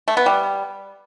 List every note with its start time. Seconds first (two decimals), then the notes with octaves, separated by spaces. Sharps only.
0.08 A3
0.17 B3
0.26 G3